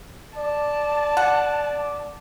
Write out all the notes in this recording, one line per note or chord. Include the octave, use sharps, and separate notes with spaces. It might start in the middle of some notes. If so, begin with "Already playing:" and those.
D5 A5
F#5